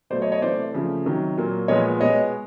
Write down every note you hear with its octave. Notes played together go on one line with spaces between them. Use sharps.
B2 F#3 A3 C5 D5
C#5 D#5
C#5 D#5
C3 E3 A3 C5 D5
C#3 F3 A3
C3 D#3 F#3
A#2 F#3 A#3
A#2 F3 G#3 B3 C#5 D#5
B2 G#3 B3 C#5 D#5